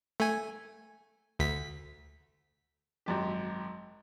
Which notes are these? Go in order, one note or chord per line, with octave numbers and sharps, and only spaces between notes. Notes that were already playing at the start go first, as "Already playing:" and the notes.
A3 G#5
D2 B6
G#1 F#2 G4